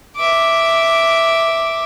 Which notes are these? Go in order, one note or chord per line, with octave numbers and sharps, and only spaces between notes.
E5 D6